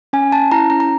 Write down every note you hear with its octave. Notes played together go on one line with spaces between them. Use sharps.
C#4 G#5
C#4 A5
E4 A#5
C#4 A#5
A#5